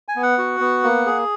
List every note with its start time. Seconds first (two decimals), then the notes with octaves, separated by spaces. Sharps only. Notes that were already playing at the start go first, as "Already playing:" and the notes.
0.08 G#5
0.16 B3
0.23 F#5
0.38 F#4
0.60 B3
0.84 A#3
1.06 G#4